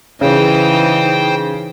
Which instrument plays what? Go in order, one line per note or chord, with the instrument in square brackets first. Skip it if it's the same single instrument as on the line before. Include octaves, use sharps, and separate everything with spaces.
[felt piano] C#3 [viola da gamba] E3 D#4 [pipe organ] C5 G5